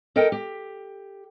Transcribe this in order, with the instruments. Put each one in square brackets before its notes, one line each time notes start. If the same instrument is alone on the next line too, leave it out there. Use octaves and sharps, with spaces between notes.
[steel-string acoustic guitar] A4 A#4 D#5 G5
G4